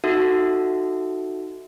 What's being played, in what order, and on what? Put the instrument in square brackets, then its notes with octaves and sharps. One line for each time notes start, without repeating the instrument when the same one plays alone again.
[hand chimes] D#4 F#4 A4 E5